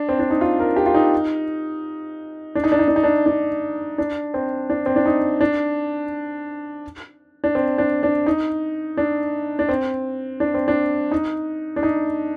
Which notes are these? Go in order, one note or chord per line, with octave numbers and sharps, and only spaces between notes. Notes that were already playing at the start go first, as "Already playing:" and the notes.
Already playing: D4
C4
D4
D#4
F4
A#4
G4
F4
D#4
D4
D#4
D4
D#4
D4
D#4
D4
D4
D4
C4
D4
C4
D4
D#4
D4
D4
C4
D4
D4
D#4
D4
D4
C4
D4
C4
D4
D#4
D4
D#4